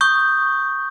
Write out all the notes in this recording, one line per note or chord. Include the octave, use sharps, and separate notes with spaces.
C#6 D#6 G6